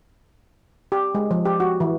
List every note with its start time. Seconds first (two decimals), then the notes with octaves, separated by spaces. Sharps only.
0.92 G4
1.15 G#3
1.31 F3
1.45 G4
1.60 F#4
1.80 E3